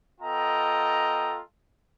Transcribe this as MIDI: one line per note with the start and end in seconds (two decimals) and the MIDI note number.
0.21 1.41 59
0.21 1.41 65
0.21 1.41 69
0.21 1.41 75
0.21 1.41 79
0.21 1.41 82